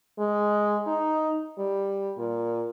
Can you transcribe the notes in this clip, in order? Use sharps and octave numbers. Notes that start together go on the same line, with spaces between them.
G#3
D#4
G3
A#2